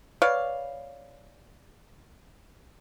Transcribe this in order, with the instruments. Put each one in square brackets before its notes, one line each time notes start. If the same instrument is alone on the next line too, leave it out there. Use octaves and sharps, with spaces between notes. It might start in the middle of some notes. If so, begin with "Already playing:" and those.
[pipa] B4 C#5 D5 F5